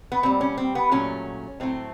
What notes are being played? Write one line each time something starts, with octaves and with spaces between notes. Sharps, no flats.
B3
A#2 G3 C4
C#4
C4
B3
A#2 F#3 A3 C#4
A2 F#3 A3 C4